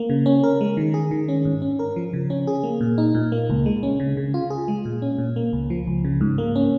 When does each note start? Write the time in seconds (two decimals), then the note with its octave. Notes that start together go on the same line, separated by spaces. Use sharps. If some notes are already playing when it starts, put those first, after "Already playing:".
Already playing: A#3
0.10 C#3
0.26 C#4
0.44 A#4
0.61 G#3
0.77 D#3
0.94 G#4
1.11 D#3
1.28 C#4
1.45 G#2
1.62 C#4
1.79 A#4
1.96 F3
2.13 C#3
2.30 C#4
2.47 G#4
2.63 A#3
2.81 A#2
2.98 D#4
3.15 A#2
3.32 A#3
3.50 C#2
3.66 G#3
3.83 C#4
4.00 C#3
4.17 C#3
4.34 F4
4.50 G#4
4.68 G#3
4.85 A#2
5.02 C#4
5.18 A#2
5.36 A#3
5.53 C#2
5.70 F3
5.87 C#2
6.04 C#3
6.21 G#2
6.38 A#3
6.55 C#4